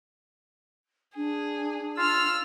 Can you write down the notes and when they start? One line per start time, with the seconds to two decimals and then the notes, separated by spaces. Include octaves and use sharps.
1.16 D4 G#4
1.97 F4 E6 F6